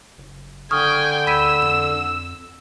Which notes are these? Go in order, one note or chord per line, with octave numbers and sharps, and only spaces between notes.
F#1
D3 G5 G#5 C#6 D#6 F6
D2 B5 E6 B6 D#7
F2 E7